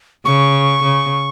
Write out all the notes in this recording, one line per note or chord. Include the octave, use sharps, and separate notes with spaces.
C#3 C#6
C#3